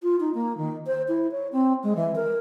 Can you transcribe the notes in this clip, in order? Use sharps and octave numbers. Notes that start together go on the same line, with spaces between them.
F4
D#4
A#3
D#3
C5
E4
C#5
C4
G#3
E3
A#4